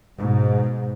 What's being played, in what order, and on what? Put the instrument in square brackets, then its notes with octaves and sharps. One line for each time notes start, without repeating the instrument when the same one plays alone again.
[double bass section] G#2 B2